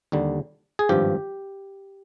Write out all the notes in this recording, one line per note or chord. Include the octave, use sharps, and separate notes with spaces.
D#2 D3 G3
G#4
G#1 G2 F3 G4